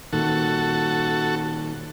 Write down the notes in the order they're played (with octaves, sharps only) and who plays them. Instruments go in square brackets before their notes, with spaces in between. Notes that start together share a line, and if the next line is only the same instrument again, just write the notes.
[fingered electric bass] A#2 D#3 [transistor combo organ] F#4 A4